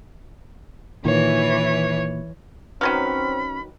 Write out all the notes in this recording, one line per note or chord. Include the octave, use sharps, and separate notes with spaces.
A#2 D#3 E3 C#5
D#3 F#3 C4 C#4 B4 B5